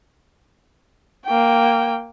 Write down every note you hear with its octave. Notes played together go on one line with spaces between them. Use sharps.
A#3 G5